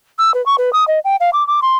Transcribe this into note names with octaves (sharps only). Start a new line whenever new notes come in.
E6
B4
C#6
B4
D#6
D#5
G5
F5
D6
D6
C6